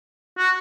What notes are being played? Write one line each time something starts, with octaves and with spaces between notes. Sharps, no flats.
F#4